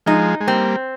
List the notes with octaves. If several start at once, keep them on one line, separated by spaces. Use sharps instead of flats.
F3 G#3 D#4
G#3
G3 A#3 C4